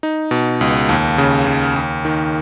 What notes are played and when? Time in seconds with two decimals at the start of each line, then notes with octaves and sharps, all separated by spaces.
0.03 D#4
0.31 B2
0.61 C#2
0.89 D#2
1.18 C#3
1.46 D#2
1.76 D#2
2.05 D#3